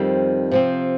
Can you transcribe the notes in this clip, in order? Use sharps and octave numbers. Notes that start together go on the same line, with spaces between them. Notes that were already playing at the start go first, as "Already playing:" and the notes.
Already playing: F2 D#3 G3 C4
C3 F3 C4